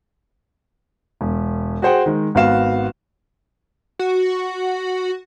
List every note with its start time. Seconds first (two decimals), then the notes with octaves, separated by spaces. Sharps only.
1.21 E1
1.82 F#4 G#4 C5 F#5 G5
2.06 D#3 G#3
2.35 G#1 B3 F#4 F5 E7
3.99 F#4